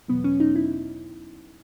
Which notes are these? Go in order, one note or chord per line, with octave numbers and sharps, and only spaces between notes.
E2 B2 F#3 B3
C#4
D#4
E4